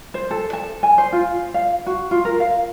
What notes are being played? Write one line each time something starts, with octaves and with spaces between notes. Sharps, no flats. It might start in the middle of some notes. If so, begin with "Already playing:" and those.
C5
A4
A5
G#5
C5
F4
F5
F#4
F4
A#4
F5